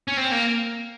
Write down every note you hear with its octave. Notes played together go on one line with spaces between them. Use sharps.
C#4
C4
A#3